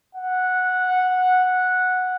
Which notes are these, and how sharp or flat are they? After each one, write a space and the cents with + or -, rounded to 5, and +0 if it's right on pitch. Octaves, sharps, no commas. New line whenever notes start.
F#5 -10